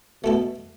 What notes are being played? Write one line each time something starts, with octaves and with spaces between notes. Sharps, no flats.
B2 A3 E4 A4